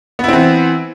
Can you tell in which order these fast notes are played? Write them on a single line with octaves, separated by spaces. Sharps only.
B3 E4 C4 E3